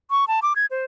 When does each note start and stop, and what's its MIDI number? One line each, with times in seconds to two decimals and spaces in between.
0.11 0.25 85
0.28 0.40 81
0.42 0.53 86
0.56 0.66 92
0.71 0.85 72